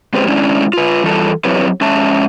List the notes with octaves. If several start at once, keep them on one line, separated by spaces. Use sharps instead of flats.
G#3 C4 C#4 G4 B4 C5
G#3 C#4 D4 E4
F4 B4
E3 G3 F4 A4 G5 A5
F#3 C4 E4 G4 B4 C#5
G#3 C#4 E5 A5